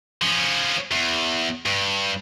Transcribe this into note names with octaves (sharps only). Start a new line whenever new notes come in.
F3 C#4
E2
G2